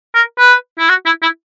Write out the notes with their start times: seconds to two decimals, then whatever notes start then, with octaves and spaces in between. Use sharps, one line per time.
0.15 A#4
0.39 B4
0.79 E4
0.89 F#4
1.06 E4
1.22 E4